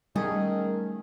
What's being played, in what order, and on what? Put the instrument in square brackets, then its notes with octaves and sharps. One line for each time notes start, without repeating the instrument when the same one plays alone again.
[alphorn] D#3 [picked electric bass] G3 [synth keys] A3 C#4 [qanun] G#4